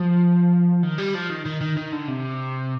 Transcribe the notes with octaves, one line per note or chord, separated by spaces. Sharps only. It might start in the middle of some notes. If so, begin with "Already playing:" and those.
Already playing: F3
D#3
G3
F3
D#3
D#3
D#3
D#3
D3
C3